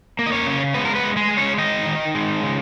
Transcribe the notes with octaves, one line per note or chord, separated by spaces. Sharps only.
A#3
D#5
C#4 C#5
C#3
G#3 B3 B4
A#4
B3 B4
G#3
G#3 G#4
G#3
C#4 C#5
D#3 D#4 D#5
D#3
G#3
C#3